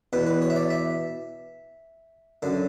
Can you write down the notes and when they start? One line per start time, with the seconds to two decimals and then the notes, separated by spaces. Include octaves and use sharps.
0.13 E2 B2 B4
0.27 B4
0.42 C#5
0.50 E5
0.56 D5
0.70 E5
2.42 F#2 D3